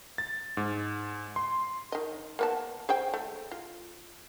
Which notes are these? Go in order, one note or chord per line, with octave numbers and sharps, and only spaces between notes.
A6
G#2
C6
D#3 D#5
A#3 B3 A5
G#4 C5 G5
A3
F4